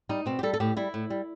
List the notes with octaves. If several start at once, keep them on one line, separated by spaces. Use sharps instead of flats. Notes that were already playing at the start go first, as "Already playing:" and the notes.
G3 D#4
B2 C4
G4
G3 A4
A4
A2 G4
G3 E4
A2
G3